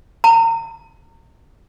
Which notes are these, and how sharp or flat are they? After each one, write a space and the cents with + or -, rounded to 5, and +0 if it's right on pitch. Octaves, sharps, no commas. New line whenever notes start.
A#5 -35